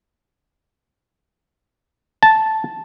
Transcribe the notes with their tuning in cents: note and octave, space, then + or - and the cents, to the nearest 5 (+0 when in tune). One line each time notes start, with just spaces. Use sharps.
A5 -5